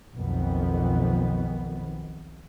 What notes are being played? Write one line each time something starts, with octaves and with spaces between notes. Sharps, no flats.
B1 F2 D#3 B3